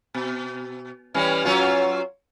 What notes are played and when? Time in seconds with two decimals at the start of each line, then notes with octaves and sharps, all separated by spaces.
0.15 B2
1.14 E3 G3 C#4
1.45 F#3 C#4 F4